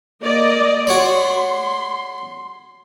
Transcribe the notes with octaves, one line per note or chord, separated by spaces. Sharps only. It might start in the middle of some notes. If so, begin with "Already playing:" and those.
A#3 D5 D#5
F#4 C#5 D5 C6